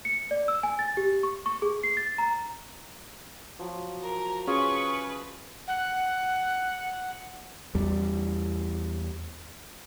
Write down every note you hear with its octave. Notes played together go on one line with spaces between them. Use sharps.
C#7
D5
E6
G#5
A6
G4
C#6
C#6
G#4
C7
A6
A#5
F3 F#3
A#4
C#4 F4 G#4 B4 C#6
F#5
E2 G3